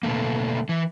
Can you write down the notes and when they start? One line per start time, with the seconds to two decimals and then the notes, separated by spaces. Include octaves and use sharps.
0.03 B2 D3 D#3 A3 A#3
0.69 E3